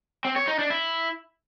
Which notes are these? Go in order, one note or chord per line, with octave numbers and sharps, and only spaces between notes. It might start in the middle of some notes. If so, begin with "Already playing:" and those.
C4
C#5
D#4
D4
E4